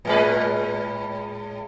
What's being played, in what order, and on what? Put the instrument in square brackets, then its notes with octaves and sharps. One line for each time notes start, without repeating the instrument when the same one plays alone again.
[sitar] A2 G#3 B4